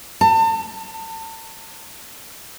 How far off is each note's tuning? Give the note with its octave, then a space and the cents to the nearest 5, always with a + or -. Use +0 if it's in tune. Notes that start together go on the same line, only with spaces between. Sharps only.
A5 +35